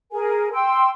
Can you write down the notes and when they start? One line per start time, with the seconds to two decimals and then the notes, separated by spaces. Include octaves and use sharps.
0.12 G#4 A#4 G#5
0.53 G5 C6 E6